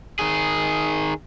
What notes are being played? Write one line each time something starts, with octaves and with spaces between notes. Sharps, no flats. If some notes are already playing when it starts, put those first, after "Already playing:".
D#3 G#4